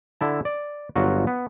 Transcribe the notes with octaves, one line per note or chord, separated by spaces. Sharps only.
D3 E4 A5
D5
G1 F#3 F4 F#4
B3